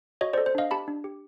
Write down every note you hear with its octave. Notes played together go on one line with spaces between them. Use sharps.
F#4 C#5 D#5
A4 C5 D5
C5
D4 D#5 F5
G4 A5 B5
D4
G4